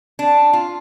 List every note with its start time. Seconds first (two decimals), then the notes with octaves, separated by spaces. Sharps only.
0.19 D4
0.53 F4